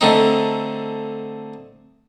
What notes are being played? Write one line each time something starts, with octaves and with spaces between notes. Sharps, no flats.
D3 A3 C4 D#4